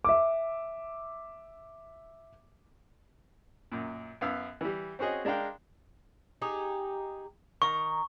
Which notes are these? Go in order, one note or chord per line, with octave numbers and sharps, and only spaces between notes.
E5 D6
F#2 A#2
F#2 B3 F5 E6
E3 G3
C4 C#4 F#4 G#4 D#5
G#3 D4 A#4 F5 G5
D#4 G4 G#4
D#3 A#5 C#6